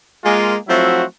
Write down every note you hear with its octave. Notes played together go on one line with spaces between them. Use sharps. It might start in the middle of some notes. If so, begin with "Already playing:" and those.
G#3 A#3 F4
F3 F#3 A3 C4 E4 F#4